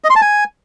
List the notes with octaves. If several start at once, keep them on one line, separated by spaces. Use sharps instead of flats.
D#5
C6
A5
G#5